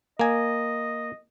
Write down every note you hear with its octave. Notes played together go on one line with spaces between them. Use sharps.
A#3 D#5 G#5